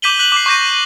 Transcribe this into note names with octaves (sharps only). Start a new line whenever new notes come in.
D6 G6 B6 D#7 F#7 G7
F#6 B6 F#7
D6 C7
C#6 D6 G6 A#6 D#7